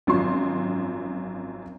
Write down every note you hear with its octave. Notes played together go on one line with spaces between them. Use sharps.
G#1 F#2 F3 C6